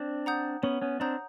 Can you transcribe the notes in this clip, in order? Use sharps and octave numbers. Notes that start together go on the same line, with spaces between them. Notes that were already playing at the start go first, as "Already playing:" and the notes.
Already playing: C4 D4
F#5 A#5 D#6 G6
B3 C#4 C#5
B3 C#4
C4 D4 F#5 A#5 D#6 G6